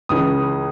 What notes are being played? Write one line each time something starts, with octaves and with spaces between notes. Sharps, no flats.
C#2 C#3 E3 D#6